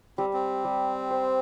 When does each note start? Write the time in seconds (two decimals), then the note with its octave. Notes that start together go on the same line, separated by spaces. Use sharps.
0.18 G3 C4
0.33 C4
0.65 G3
1.11 C5